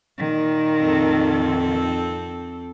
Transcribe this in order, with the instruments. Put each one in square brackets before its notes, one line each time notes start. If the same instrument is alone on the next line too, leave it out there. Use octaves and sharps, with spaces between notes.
[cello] A#2 D#3
[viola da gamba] F2 C4 A4